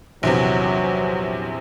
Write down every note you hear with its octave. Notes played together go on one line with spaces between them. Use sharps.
A#1 E2 C3 F#3